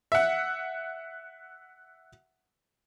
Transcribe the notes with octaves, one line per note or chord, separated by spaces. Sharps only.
E5 F#5